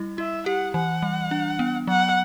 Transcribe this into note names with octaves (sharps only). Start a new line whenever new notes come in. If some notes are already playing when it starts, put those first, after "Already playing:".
Already playing: G3 E4
E4 E5
G4 F#5
E3 F#5
G3
D4
B3
F#3 F#5